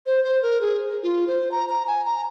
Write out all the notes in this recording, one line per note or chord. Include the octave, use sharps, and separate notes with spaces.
C5
C5
A#4
G#4
F4
C5
A#5
A#5
G#5
A#5